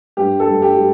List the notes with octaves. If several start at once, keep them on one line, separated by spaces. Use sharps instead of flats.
G2 G4
A4
G2
G4
G3